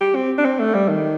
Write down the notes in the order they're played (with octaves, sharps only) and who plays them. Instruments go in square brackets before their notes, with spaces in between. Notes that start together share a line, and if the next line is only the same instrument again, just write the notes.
[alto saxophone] G4
C4
D4
C4
A3
G3
D#3